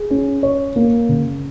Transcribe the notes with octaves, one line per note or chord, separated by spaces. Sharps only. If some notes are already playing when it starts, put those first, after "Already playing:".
Already playing: G#4
C#4
C#5
A#3
C#3